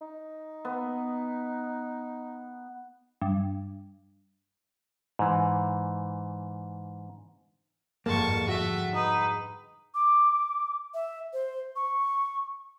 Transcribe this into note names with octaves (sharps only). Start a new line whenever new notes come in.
D#4
B3
G2
G#2 E3
G1 F2 G#2 A#3 A5 C#6
A3 F#4 E5 F#5
D#4 B4
D6
E5
C5
C#6